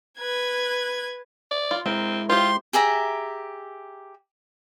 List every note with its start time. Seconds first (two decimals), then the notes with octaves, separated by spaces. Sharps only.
0.19 B4 G#6
1.51 D5
1.71 F4
1.86 G#3 C4 E4 A#4
2.30 F4 G4 C5 C6
2.73 G4 G#4 E5 A#5